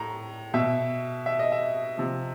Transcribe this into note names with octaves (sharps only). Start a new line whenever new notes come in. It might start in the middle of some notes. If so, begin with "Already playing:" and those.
Already playing: A2 A#5
B2 E5
E5
D#5
E5
C3 F3